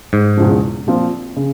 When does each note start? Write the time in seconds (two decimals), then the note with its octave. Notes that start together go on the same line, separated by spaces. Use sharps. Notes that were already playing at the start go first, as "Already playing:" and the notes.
0.13 G#2
0.37 E1 E2 C#3 F3
0.87 A#2 F3 C4 F4
1.36 C#3